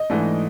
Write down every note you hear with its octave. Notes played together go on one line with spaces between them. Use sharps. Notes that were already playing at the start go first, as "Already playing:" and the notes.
Already playing: D#5
G#2 E3 A3 D4